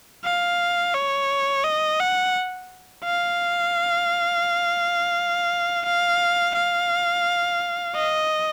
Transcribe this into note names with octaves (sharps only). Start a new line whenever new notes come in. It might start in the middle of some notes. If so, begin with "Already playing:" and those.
F5
C#5
D#5
F#5
F5
F5
F5
D#5